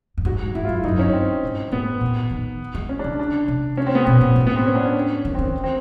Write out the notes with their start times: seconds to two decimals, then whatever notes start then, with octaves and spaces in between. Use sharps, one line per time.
0.18 G2
0.25 G#2 F#4
0.55 G#2 E4
0.65 F4
0.69 F#2
0.75 E4
0.84 F#2 D#4
0.98 G2 C#4
1.13 C4
1.43 G#2
1.72 A2 B3
2.01 A#2
2.31 D#3
2.75 G#3
2.89 C#4
2.99 D4
3.04 C#3
3.19 D4
3.48 C3
3.77 C#4
3.86 C4
3.95 B3
4.05 B2 C4
4.21 A#2
4.36 A2
4.47 B3
4.56 C4
4.65 C#4
4.75 D4
4.85 C#4
5.25 D#3
5.35 C4
5.39 D#3
5.64 C4